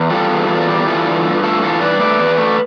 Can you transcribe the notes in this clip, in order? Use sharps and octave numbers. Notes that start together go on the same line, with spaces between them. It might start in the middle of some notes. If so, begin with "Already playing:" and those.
Already playing: E2
G3 F4 A4
E2
E2
G3
E3 F4 A4
G2
G2
A3 F4 A4
E3 F4 A4
G2 B4 D5
A3 B4 D5
E2
A3